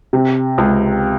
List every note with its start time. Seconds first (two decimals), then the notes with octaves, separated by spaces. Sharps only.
0.13 C3
0.58 C#2